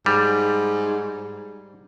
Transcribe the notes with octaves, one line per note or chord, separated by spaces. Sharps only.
G#2 G3